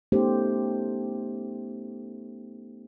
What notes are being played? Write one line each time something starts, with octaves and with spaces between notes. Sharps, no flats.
A3 B3 C#4 D#4 G4 C5